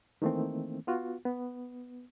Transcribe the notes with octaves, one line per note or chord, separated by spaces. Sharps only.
D#3 E3 A3 A#3 C4
B3 F4 F#4
B3